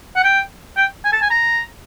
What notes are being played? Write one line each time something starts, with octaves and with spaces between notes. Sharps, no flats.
F#5
G5
G5
G#5
A5
G#5
A#5